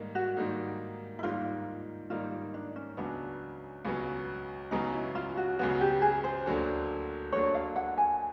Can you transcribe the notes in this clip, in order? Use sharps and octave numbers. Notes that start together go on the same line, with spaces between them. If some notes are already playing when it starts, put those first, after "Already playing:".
Already playing: G#2 D#3 G3 A#3 D#4
F#4
G#2 D#3 G3 A#3 D#4
E4
G#2 D#3 G3 A#3 D#4 F4
G#2 D#3 G3 A#3 D#4 F4
D4
C#4
C#2 C#3 F#3 B3 D4
C#2 C#3 F#3 B3
C#2 C#3 F#3 B3 D#4
E4
F4
F#4
C#2 C#3 F#3 B3 F#4
G4
G#4
C5
D2 D3 F#3 A#3 D4
D2 D3 F#3 A#3 D4 C#5
F5
F#5
G#5